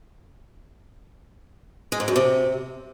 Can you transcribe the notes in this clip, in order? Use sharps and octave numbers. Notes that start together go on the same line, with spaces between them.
G#3
G#2
F#2
C3